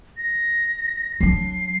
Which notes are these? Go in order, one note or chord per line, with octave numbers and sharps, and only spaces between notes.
A#6
F#3 D4 C7